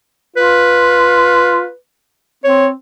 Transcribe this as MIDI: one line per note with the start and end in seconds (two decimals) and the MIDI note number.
0.37 1.66 65
0.37 1.76 71
2.44 2.72 60
2.44 2.67 73